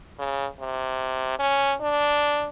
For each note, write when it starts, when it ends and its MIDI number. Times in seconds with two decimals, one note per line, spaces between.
0.19 0.47 49
0.60 1.35 48
1.39 1.74 61
1.81 2.49 62